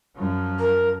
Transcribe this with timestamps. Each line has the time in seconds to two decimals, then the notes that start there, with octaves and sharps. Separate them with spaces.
0.16 F#2 F3
0.59 A#4